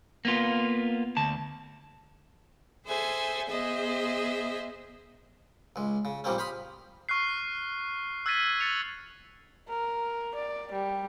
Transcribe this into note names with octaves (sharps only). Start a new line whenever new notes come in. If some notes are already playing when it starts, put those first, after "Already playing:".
A#3 B3 F4
D2 A5
G#4 A4 C5 E5 G#5
B3 G#4 C5 D#5 E5
C#2 G#3
C#3
A#2 F3 G3 A#3 C4 C#4
C5 F5 B5 C6 D#6
C#6 F6 F#6 C7
E6 F#6 G#6 A6 B6 D#7
A6 C#7 F7
A#4
D5
G3